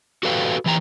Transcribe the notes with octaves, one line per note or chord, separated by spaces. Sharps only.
F#4 G4 A4 B4 F5 G5
E3 G4 G5 A#5